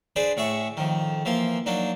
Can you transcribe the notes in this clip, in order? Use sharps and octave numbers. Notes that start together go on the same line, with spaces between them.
D4 G#4 B4 C5 D5
A2 G#4 E5 C#6
F2 D#3
E3 F3 A#3 C6
F#3 A#3 D4 D#4